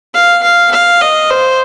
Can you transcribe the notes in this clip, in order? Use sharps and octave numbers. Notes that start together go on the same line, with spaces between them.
F5
F5
F5
D#5
C5